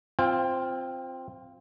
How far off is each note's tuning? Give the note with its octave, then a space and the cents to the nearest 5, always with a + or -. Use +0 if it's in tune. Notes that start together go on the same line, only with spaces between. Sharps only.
C4 +0 F4 +0 G5 +45